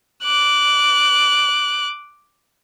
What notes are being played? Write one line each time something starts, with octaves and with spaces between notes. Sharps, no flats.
D6 F#6